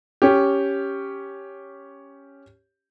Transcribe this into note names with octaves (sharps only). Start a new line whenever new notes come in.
C#4 G4